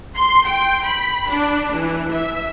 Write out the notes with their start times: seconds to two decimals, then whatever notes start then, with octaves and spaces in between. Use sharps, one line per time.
0.16 C6
0.46 G5
0.84 B5
1.29 D4
1.75 E3
2.11 E5